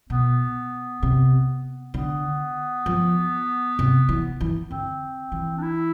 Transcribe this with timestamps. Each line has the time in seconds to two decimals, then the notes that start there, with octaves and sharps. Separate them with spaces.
0.10 B2 B3
1.03 C3
1.94 D3 B3
2.86 F3
3.79 C3
4.09 E3
4.41 E3
4.70 D3 C4
5.32 E3
5.58 D4
5.62 E4